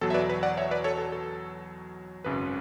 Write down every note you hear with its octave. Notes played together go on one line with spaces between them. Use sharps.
E2 B2 F#3 A4
E5
B4 D5
B4
D5 F#5
C#5 E5
B4 D5
A4 C#5
A4
A4
G#1 F#2 C#3 B4